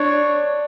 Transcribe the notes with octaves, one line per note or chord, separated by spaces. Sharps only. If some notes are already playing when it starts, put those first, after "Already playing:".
Already playing: D4 C#5